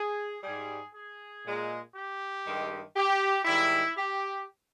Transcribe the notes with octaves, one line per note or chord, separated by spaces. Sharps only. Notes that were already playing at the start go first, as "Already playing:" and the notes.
Already playing: G#4
G#2 G3 G#4
G#4
A#2 G#3
G4
G2 D#3 G#3
G4
G#2 D#3 G3 E4
G4